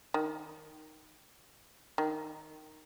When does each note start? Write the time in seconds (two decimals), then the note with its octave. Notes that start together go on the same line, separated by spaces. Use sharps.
0.14 D#3
1.98 D#3